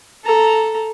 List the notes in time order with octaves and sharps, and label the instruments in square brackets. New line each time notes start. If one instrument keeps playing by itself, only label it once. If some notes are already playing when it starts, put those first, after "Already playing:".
[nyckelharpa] A4 A#5